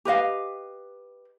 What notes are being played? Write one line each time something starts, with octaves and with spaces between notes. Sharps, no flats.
G4 B4 D#5 F5